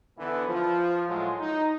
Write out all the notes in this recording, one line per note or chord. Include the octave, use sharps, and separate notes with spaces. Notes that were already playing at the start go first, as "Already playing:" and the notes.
D3 E3 B3
F3
A2 F#3 G#3 F4 F#4
D#4